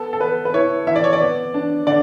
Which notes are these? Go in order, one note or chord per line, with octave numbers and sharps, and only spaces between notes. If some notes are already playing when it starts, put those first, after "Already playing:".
Already playing: B3 A4
A4
B3 B4
B4
E4 C#5
E4 E5
D5
C#5
D5
B3
D4
D3 D5